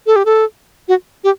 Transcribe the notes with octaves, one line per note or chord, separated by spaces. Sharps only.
A4
G4
A4
F#4
G4